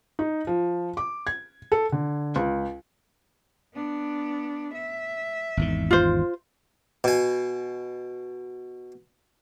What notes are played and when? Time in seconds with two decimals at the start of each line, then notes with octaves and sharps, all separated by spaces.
0.19 D#4
0.47 F3
0.97 D6
1.27 G#6
1.72 A4
1.92 D3
2.36 C#2
3.74 B3 D4
4.75 E5
5.57 G#1 E2 D#3
5.91 F4 C5
7.04 B2 G#5